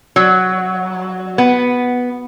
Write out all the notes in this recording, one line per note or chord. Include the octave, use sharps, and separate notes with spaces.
F#3
B3